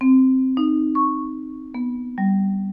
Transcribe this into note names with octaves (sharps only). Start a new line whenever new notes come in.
C4
D#4
C#6
B3
G3